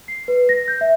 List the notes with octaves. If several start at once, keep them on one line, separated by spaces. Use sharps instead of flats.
C7
B4
A#6
G6
E5